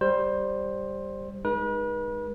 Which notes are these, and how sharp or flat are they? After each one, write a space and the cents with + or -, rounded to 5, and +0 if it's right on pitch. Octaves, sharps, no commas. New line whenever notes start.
G3 +0 C5 +15
G#3 +0 D#4 +0 B4 -40